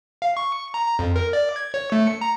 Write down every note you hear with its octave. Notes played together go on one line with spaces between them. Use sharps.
F5
C#6
A#5
A#5
F2
A#4
D5
G#6
C#5
A3
C#7
A#5